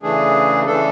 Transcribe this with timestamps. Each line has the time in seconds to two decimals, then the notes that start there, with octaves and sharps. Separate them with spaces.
0.03 C#3 E3 A3 D4 G#4
0.66 C#3 E3 A3 D4 A4